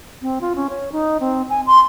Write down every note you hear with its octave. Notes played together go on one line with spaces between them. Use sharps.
C4
F4
C#4
C#5
D#4
C4
G#5
C6